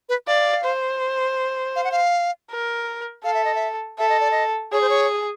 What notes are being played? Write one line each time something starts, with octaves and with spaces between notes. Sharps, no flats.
B4
D5 F5
C5
F5
F#5
F5
A#4
A4 F5
E5
D#5
E5
A4 E5
D#5
D5
D#5
G#4 C#5
C5
C#5